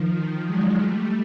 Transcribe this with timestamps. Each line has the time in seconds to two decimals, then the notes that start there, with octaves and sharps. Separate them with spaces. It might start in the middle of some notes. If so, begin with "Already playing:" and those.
Already playing: D#3 F3
0.45 F#3 G#3
0.80 G3 A3